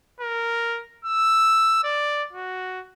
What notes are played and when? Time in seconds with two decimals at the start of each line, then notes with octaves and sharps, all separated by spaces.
0.21 A#4
1.05 E6
1.84 D5
2.33 F#4